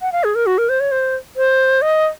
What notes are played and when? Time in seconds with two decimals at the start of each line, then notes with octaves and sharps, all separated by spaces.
0.02 F#5
0.12 F5
0.24 G#4
0.35 A#4
0.46 F#4
0.58 A#4
0.69 C5
0.80 C#5
0.92 C5
1.37 C5
1.82 D#5